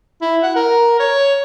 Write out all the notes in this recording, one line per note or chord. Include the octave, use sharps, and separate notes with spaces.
E4
F#5
A#4
C#5